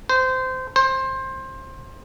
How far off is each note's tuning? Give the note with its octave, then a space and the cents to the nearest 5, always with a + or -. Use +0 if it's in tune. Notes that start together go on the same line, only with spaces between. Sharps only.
C5 -20
C5 +20